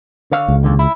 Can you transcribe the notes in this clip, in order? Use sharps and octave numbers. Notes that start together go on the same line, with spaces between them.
D3 C#5 F5
C#2
D#2 D3
E4